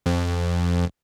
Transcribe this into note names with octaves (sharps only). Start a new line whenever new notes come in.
F2